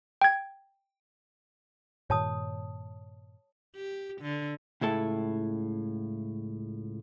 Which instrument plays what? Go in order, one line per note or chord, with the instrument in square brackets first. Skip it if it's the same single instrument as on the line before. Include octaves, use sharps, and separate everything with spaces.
[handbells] G5 G#6
[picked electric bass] G2 A#2 D#3 [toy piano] C#5 A5 D#6
[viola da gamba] G4
D3
[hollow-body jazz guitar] C#2 A2 E4 A4